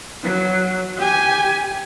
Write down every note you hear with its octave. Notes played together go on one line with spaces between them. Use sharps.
F#3
G4 G#5